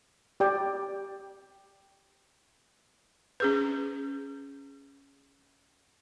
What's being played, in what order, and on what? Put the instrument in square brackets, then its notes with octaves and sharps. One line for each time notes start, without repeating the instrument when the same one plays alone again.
[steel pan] G4 D5 G5
[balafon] C#4 G#4 B4